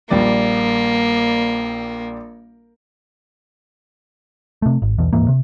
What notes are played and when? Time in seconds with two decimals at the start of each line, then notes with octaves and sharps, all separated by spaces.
0.10 A#1 G3 A#3 D5
4.62 C3 A3
4.82 G#1
4.98 B1 E2 B2
5.13 D1 G#2 E3 A#3
5.28 C3